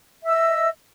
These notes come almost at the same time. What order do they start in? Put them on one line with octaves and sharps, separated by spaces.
E5 E6 D#5